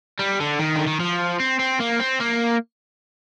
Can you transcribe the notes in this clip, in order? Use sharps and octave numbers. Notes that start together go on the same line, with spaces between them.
G3
D3
D#3
D3
D#3
F3
C4
C4
A#3
C4
A#3